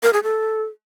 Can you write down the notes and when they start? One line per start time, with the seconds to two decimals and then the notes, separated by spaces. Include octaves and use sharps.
0.03 A#4
0.13 G#4
0.23 A4